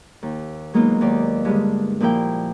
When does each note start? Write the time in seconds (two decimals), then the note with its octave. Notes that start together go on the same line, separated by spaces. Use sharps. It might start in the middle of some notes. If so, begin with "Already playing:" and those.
0.23 D#2
0.74 F#3 G#3 A#3 B3 D#4 F4
1.01 D#2 D#4 D5
1.45 G2 D3 G#3
2.00 A#2 F3 E4 A#4 G5